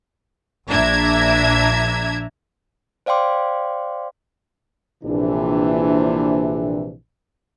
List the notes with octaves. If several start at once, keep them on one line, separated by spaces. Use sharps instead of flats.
A#1 D4 E5 A#5 G#6
C5 D5 F5 G5 C6 D6
A#1 C3 E3 D4